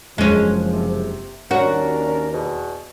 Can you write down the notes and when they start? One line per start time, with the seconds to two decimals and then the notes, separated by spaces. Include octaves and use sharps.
0.18 F#1 F3 G#3 C#4
0.73 C3
1.51 D#2 C#4 D4 F#4 A#4 C#5
2.33 E2 B2